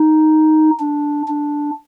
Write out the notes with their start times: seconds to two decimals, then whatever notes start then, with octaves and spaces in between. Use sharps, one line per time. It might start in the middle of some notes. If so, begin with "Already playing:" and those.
Already playing: D#4
0.80 D4
1.28 D4